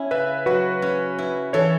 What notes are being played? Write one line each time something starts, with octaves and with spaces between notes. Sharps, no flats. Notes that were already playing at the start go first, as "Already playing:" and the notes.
Already playing: C#4 E4
C#3 B4 E5
F#3 F#4 B4
C#4
E4
E3 A4 C#5